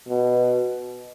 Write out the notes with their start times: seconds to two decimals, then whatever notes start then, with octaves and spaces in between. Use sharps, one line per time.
0.09 B2